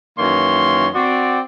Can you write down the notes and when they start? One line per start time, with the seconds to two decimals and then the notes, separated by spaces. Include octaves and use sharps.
0.19 F#2 D#3 E3 A#3 C#5 C6
0.95 C4 F#4 D5